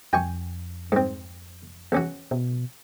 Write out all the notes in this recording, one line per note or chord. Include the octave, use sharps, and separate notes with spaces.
F2 G5 G#5 C#6
G#2 C4
E2 C#4 F#4
B2